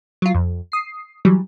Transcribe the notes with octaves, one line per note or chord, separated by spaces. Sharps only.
F#3 F4
F2
D#6 C7
E3 F#3 G3